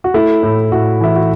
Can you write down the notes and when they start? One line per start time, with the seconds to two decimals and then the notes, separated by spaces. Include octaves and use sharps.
0.04 F#4
0.14 A3 E4
0.43 A2
0.72 A2 F#4
1.01 E3 E4
1.16 F#4